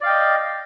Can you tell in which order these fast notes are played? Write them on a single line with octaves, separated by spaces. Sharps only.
D5 F5 G5 D#5